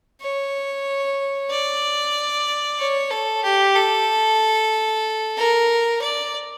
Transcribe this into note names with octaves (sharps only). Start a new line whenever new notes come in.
C#5
D5
C#5
A4
G4
A4
A#4
D5